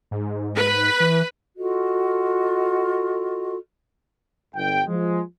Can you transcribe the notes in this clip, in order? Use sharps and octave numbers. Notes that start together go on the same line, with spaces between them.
G#2
B4
E3
F4 F#4 A4 D#5
G1 G5
F3 G#3